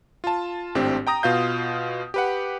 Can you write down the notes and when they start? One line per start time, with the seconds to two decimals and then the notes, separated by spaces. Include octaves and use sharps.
0.24 F4 A5
0.75 G#1 A2 C4 D4 G4
1.07 G5 A#5 D#6 A#6
1.23 B2 F4 F5 G6
2.14 G4 B4 F#5